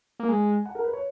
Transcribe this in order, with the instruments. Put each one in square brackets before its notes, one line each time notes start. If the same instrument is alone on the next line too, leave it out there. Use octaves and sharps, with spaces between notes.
[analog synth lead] A#3
[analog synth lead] G#3 [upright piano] G#5
[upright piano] F#5
A#4
B4
C#5